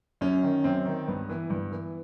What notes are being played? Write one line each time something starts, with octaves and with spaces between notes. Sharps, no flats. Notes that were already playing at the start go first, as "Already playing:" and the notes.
F#2 C#4
D#3
F#2 C4
D#3
G2 B3
E3
G2
E3